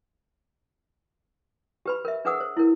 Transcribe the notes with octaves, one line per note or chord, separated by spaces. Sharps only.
G4 B4 B5
A#4 E5
D4 G#4 B4 F#5 D#6 E6
C5
E4 A#4